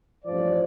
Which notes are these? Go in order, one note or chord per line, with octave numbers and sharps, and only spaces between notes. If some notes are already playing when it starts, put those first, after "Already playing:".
A1 G2 F3 D5